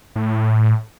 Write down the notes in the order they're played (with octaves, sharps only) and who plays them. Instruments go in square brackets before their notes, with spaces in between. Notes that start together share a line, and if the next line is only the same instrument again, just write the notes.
[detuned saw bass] A2